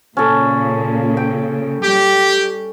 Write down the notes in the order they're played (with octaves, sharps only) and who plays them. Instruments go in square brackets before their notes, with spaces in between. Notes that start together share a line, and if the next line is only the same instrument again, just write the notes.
[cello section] A#2 C#3 [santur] C#4 A4
[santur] G5
[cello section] G3 [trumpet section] G4